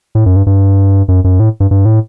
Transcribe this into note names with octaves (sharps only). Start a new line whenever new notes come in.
A2
F#2
G2
G2
F#2
F#2
A2
G2
G2
A2